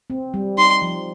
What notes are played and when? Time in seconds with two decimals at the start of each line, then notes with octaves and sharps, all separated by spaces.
0.10 C4
0.34 G3
0.58 D#4 C6
0.82 F3